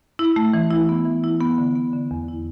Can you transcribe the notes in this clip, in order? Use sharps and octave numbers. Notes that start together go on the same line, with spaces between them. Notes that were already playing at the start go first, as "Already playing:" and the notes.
E4
A3
E3
E4
B3
E3
E4
B3
D3
B3
D3
E2
E4